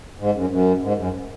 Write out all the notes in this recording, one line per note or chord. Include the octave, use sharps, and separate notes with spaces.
G#2
F#2
F#2
G#2
F#2